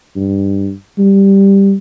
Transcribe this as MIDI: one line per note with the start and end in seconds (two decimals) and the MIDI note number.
0.16 0.72 43
0.99 1.75 55